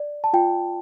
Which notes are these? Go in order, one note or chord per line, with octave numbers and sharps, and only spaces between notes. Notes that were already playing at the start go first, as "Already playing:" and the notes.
Already playing: D5
A5
F4 G5